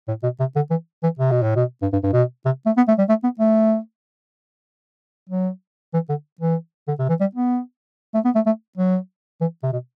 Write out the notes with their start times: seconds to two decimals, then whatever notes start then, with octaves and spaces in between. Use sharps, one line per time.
0.08 A2
0.23 B2
0.39 C3
0.55 D3
0.70 E3
1.03 E3
1.19 C3
1.31 B2
1.43 A2
1.56 B2
1.82 G2
1.92 G2
2.03 G2
2.13 B2
2.45 C3
2.66 A3
2.77 B3
2.88 A3
2.98 G3
3.09 A3
3.23 B3
3.39 A3
5.29 F#3
5.93 E3
6.09 D3
6.41 E3
6.88 D3
6.99 C3
7.09 E3
7.20 G3
7.35 B3
8.14 A3
8.25 B3
8.35 A3
8.46 A3
8.77 F#3
9.41 E3
9.63 C3
9.72 B2